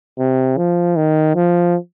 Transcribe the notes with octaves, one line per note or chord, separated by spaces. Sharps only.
C3
F3
D#3
F3